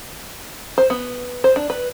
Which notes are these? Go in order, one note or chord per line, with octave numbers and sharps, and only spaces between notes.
C5
B3
C5
D4
B4